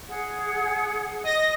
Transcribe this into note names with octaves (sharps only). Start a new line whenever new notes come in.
G#4 F#5
D#5 A#6